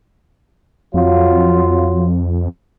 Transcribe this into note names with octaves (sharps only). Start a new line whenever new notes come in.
F2 F#3 F4